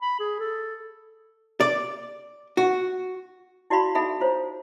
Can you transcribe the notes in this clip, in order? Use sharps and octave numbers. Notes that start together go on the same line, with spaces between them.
B5
G#4
A4
D5
F#4
E4 F#4 D5 F5 B5 C6
D#4 G#4 A4 E5 F#5 B5
F4 C5 C#5